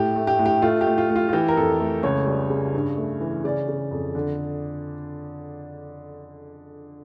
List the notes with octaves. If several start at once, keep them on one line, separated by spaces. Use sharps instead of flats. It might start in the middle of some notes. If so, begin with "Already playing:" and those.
Already playing: A2 G4
A3
G4
A2
G4
A3 F4
G4
A3
F4
A3
F4
F4
E3 G4
A#4
F2 A4
A3
C#2 C#5
G3
C#3
G2
A3
E3
C#3 D5
C#3
F2
D3